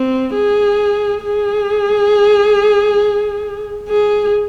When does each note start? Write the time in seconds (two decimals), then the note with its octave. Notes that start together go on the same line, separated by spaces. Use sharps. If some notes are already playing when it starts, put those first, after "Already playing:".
Already playing: C4
0.34 G#4
1.23 G#4
3.89 G#4